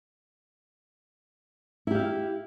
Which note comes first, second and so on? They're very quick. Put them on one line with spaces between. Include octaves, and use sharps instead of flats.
E4 G4 F5